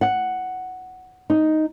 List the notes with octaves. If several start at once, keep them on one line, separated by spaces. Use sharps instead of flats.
F#5
D#4